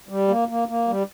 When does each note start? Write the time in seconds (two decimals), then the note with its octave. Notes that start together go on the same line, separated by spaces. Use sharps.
0.09 G3
0.28 A#3
0.48 A#3
0.68 A#3
0.88 G3